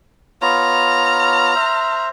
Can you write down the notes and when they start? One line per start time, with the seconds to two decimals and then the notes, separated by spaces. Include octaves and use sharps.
0.42 B3 F4 C#5 A#5 F6
1.55 C5 E5